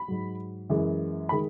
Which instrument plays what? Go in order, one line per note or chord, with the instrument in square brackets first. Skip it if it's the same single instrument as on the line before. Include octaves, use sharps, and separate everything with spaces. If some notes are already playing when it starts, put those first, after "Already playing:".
Already playing: [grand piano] B5
G#2 F#3
F#2 E3 G#3
D#3 G#3 B5